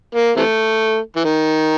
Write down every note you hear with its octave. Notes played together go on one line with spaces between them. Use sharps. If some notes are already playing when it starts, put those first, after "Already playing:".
A#3
C3 E3 A3
E3
D#3